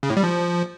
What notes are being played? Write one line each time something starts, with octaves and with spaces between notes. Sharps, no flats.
C#3
A2
G3
F3